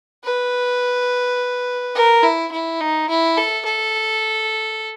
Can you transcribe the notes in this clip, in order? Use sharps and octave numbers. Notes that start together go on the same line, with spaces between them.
B4
A#4
E4
E4
D#4
E4
A4
A4